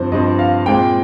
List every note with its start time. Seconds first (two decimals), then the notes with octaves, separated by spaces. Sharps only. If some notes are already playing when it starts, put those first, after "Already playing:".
Already playing: G2 F3 C4 C5
0.12 G2 F3 C4 D#5
0.39 F5
0.66 A#2 G#3 C4 G5